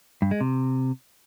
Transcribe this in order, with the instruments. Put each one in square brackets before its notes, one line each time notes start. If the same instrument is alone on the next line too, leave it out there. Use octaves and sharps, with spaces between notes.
[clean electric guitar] G2
G#3
C3